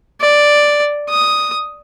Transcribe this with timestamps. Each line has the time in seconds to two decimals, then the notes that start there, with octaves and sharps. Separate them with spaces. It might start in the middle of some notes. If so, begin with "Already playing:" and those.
0.21 D5
1.10 D#6